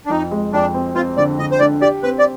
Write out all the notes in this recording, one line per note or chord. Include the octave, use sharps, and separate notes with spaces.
D4
F2 D#4
G#3
F2 D4
C4
C4 F4
D3 D5
D3 D#5
C5
D3 D5
G4 D5
C4 B4
D5